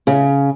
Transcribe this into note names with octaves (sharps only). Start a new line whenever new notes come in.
C#3